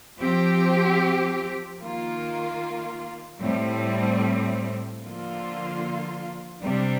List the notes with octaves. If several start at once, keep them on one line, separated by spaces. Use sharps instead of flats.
F3 C4 G4
D#3 A#3 F4
A2 G3 C4
D3 F3 A#3 F4
C3 G3 D4